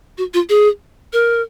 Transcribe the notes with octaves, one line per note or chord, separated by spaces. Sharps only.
F#4
F4
G#4
A#4